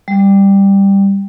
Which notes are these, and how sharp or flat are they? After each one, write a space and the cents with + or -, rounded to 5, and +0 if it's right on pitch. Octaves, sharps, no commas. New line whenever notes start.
G3 +10